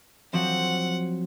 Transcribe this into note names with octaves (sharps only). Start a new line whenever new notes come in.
F3 F#3 C4 F#5